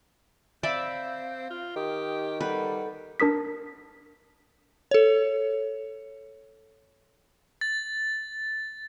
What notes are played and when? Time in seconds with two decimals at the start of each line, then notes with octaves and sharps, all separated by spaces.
0.63 C4 D5 E5 F5 B5 G6
1.50 F4
1.76 D#3 G4 D#6
2.41 G3 A4 B4 F#5
3.20 D4 A#4 D#6 B6
4.91 A4 C#5
7.61 A6